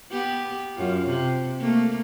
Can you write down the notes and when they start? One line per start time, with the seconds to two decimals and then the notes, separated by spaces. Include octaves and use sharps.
0.11 B3 G4
0.77 F#2 F4
1.07 C3
1.59 A3 A#3